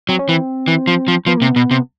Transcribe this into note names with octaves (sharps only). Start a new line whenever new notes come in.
F#3 C4
C#4
E3 C4
E3
F3
F3
F3 B3
C3 A#3
B3
B2
C3